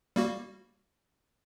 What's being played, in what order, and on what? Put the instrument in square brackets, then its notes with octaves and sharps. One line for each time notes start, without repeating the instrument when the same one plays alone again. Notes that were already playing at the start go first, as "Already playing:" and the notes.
[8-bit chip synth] G3 A#3 F#4